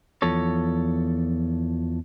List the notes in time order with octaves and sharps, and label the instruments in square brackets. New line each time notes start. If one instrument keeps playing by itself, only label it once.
[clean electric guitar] E2 F3 A4 C#5